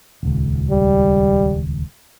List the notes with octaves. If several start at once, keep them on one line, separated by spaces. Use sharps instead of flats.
D#1 C#2
G3